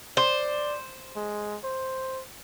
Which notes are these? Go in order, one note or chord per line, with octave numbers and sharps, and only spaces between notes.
C5 D5
G#3
C5